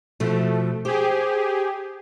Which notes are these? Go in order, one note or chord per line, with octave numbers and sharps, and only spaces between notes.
B2 F3 A3
G4 G#4 C5